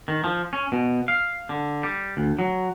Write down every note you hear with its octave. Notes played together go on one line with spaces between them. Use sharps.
D#3
F3
C#4
B2
F5
D3
G3
D2
F#3